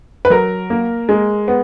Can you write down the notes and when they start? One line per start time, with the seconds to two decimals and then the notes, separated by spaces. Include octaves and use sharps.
0.25 B4
0.30 F#3 A#4
0.70 A#3
1.09 G#3
1.48 B3